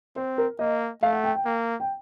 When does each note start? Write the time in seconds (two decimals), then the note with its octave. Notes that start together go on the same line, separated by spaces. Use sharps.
0.16 C4 C5
0.38 A#4
0.59 A#3 D#5
1.02 A3 F5
1.13 F#5
1.24 G5
1.35 G5
1.45 A#3
1.80 G5